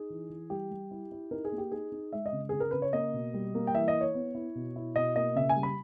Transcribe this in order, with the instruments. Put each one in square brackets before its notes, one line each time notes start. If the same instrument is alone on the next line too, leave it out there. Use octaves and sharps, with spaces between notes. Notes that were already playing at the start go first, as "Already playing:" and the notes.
Already playing: [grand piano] D#4 G#4
E3
E3
G3 G4
G3
E4
E4
D#4 A#4
G#4
A#3
G4
D#4 G#4
D#4
G#3 E5
D#5
C#3
C#3 G#4
A#4
C#3 B4
C#5
A#3 D#5
B2
G3
A#3
G5
E3 E5
D#5
E4
C#5
B3
E4
B2
E4
B2 D#5
A#3 D#5
C#3 E5
G#5
G3
B5